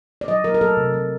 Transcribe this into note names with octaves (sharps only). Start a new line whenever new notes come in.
D5
F#3 D#5
F#3 A#4
A#4
F#3 A4
C3
F#3